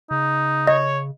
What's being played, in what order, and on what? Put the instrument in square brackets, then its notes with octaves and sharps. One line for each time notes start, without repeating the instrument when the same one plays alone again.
[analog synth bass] C#3 [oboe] D#4
[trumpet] C#5 [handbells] D#5